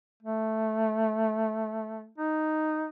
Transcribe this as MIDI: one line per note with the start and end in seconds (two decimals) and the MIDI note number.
0.23 2.08 57
2.18 2.88 63